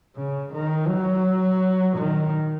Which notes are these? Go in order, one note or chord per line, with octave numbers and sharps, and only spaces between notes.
C#3
D#3
F#3
D#3